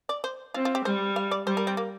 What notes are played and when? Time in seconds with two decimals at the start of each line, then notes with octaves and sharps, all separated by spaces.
0.09 D5
0.24 C5
0.54 C4 F4
0.65 F4
0.75 G4
0.85 G3 C5
1.16 F5
1.31 D5
1.47 G3 C5
1.57 A#4
1.67 C4
1.77 A#3